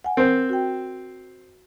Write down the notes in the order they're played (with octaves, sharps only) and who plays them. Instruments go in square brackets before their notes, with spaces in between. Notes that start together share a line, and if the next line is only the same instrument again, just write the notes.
[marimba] F#5 G#5
[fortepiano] C4 C5 [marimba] A#4
[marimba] F#4 G5